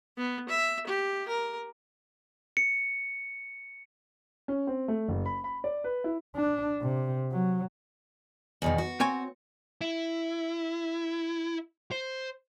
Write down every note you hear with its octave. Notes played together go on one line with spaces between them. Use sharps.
B3
E5
G4
A#4
C#7
C#4
C4
A3
F#1
B5
B5
D5
B4
E4
D4
C3
F#3
E2 B2 D#3
F#4
C4 C#5 G#5
E4
C5